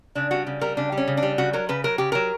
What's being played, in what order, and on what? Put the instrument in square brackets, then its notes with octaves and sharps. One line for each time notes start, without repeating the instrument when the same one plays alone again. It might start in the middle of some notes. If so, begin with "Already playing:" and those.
[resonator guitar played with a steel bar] C#3 D4
G3 F#4
C#3
G3 A#4
C#3 D4
G3
C#4
C#3
D4
G3
C#3 F#4
F#3 A#4
C#3 B4
F#3 A#4
C#3 G4
F#3 A#4